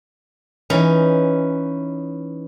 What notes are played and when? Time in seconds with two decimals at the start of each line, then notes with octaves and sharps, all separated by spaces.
0.70 E3 C#4 D#4